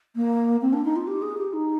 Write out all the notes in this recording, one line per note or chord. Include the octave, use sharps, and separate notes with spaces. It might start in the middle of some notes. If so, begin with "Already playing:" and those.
A#3
C4
D4
D#4
F4
G4
G#4
G4
D#4